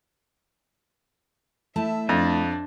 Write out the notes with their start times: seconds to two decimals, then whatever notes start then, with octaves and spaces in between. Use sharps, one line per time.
1.76 A3 E4 E5 A5
2.09 F2 D4